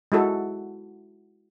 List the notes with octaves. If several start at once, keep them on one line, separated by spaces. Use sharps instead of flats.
G#3 E4 F#4 A4